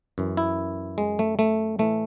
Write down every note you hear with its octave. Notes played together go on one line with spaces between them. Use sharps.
F#2 E3
E4
G#3
A3
A3
A2 E3 A3